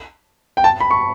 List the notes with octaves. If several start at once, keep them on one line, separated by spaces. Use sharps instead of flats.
G5
A5
B5
C#6